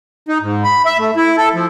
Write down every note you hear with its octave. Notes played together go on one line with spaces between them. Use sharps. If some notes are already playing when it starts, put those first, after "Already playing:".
D#4
G#2
B5
E5
A3
E4
A4
F3